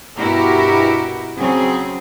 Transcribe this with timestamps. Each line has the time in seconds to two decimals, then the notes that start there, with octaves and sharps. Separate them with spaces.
0.18 G2 B2 E4 F#4 G4 A#4
1.37 C#3 F#3 C4 C#4 G#4